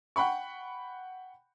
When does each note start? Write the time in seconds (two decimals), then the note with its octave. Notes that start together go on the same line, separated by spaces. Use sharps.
0.16 F#5 G5 B5 C#6